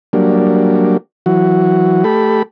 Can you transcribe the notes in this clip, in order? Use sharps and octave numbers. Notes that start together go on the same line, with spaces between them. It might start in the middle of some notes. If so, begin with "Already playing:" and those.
F#3 G3 A#3 D4
E3 F#3 F#4
A3 G4 A4 B5